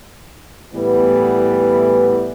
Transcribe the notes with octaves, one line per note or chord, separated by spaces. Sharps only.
A2 E3 G3 B3